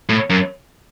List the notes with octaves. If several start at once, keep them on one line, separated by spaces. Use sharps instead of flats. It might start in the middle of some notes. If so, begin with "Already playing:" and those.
A2
F#2